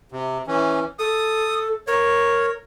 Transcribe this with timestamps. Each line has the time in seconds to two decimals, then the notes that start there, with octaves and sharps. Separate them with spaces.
0.12 C3
0.47 E3 C#4
0.99 A4 D#6
1.87 A#4 C#5